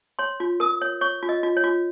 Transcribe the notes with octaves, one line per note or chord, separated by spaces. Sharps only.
C#5 C6
F4
A#4 D#6
C#5
C#5 C#6
F4
D#5
F4
C#5
F4